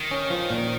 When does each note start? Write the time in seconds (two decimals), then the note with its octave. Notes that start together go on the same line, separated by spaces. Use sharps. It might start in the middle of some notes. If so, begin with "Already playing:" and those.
Already playing: D#3
0.11 C#4
0.30 F3
0.50 A#2